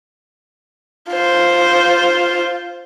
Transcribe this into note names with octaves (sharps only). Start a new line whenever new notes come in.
F4 C5